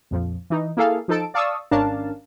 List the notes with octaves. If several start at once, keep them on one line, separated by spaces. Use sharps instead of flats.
A#1 F2 F3
E3 D#4
A#3 E4 G#4 A4 F5
F3 D#4 A4 A5 D7
D5 F5 A5 C#6 D#6 E6
G#1 C#4 D4 A#4 F5 A5